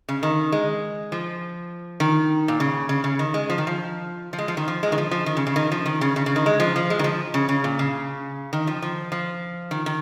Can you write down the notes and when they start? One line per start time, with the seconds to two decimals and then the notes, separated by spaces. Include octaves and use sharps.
0.09 C#3
0.23 D#3
0.52 G#3
1.12 F3
2.00 D#3
2.48 A#2
2.60 C#3
2.89 C#3
3.04 C#3
3.19 D#3
3.34 G#3
3.50 F3
3.58 D#3
3.67 F3
4.33 F3
4.39 G#3
4.48 F3
4.57 D#3
4.68 F3
4.83 G#3
4.92 D#3
4.98 F3
5.11 F3
5.26 D#3
5.37 C#3
5.47 C#3
5.56 D#3
5.72 F3
5.86 D#3
6.01 C#3
6.16 C#3
6.26 C#3
6.36 D#3
6.46 G#3
6.60 F3
6.76 F3
6.90 G#3
6.99 D#3
7.04 F3
7.34 C#3
7.49 C#3
7.64 A#2
7.79 C#3
8.53 D#3
8.67 F3
8.82 F3
9.12 F3
9.71 D#3
9.86 D#3